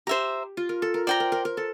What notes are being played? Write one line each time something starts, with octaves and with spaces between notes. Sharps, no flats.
G4 C5 E5 A#5
F4
A#4
A4
A#4
C5 D5 G5 A#5
A#4
A#4
A#4
A4